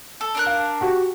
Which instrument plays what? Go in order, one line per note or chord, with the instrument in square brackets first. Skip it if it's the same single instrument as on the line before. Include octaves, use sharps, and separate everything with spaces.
[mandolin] A4
D4 A#4 F#6
[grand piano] F5
F#4 G4